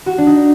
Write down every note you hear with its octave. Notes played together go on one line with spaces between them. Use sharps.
F#4
D4
D#4